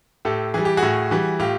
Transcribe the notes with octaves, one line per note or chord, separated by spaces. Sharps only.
A2 G4 A4
E3 G3 G#4
G4
F#4 G#4
A2
E3 G3
A2 F4 G4